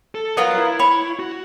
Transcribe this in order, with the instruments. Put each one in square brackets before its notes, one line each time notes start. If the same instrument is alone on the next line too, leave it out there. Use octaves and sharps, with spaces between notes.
[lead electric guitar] A4
[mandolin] B3 F4 A#4 [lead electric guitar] C#5 A#5
[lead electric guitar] E4
[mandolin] C#5 [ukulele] B5
[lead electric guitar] F#4